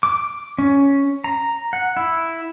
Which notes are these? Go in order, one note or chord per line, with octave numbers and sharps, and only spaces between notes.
D6
C#4
A#5
F#5
E4